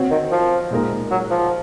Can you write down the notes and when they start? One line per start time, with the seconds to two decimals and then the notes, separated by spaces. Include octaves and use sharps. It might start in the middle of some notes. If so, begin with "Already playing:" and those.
Already playing: C4 F#4 C#5
0.11 D#3
0.31 F3
0.71 A#2 G#3 D#4 A#4
1.11 F#3
1.30 F3